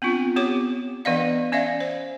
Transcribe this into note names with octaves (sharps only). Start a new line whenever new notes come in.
B3 C4 D4 F4
B3 G4 C#5 D6
E3 B3 D4 D5 D#5 F5
C#4 D5 E5 F5
C5